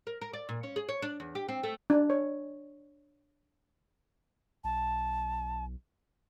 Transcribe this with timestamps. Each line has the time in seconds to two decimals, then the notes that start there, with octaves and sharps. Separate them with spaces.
0.07 A#4
0.21 A#4
0.33 D5
0.49 A#2
0.63 C#4
0.76 G#4
0.89 C#5
1.02 D4
1.20 E2
1.35 G4
1.49 C4
1.63 A3
1.90 D4
2.10 C#5
4.64 B1 A5